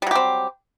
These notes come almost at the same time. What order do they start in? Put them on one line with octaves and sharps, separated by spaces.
G3 F#3 G4 C4